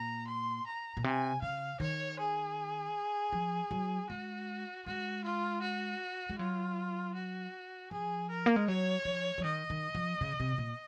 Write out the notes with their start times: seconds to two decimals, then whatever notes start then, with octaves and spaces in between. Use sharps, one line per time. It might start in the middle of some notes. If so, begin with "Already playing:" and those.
Already playing: A#2 A#5
0.27 C6
0.66 A#5
0.97 A#2
1.04 C3 G#5
1.42 C#3 F5
1.80 D#3 C#5
2.19 G#4
3.33 F3
3.71 F#3
4.09 G#3 F#4
4.86 G#3 F#4
5.24 F4
5.62 F#4
6.29 G#3
6.38 F#3 F4
7.14 F#4
7.91 F3 G#4
8.30 A#4
8.46 A#3
8.56 G#3
8.67 F#3 C#5
9.05 F3
9.38 F3
9.44 D#3 D#5
9.70 D#3
9.95 F3
10.21 C#3
10.40 C3
10.58 A#2